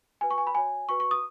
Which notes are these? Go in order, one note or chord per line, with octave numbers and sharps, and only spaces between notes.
F#4 B4 G#5
C#6
G#5
B5
F#4 C#5 G#5
F#4 B4 C#6
C#6
D#6